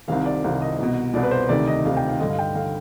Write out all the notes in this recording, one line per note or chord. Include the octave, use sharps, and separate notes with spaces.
C2 C3 D#3 F5
D5
C2 C3 D#3 F5
D#5
C2 B2
C2 B2 D5
B4
C5
D2 C3 D#3 D5
D#5
D2 C3 D#3 F5
G5
F5
G2 D3 D#5
F5
G5
D3 F5